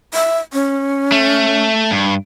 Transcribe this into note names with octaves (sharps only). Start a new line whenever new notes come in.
E5
C#4
A3
G2